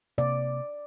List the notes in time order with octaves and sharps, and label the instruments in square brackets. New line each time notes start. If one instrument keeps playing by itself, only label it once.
[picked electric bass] C3 A#3 C4 [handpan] D5